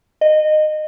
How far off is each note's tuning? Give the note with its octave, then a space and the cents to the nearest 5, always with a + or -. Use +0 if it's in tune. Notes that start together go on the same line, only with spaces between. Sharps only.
D#5 -20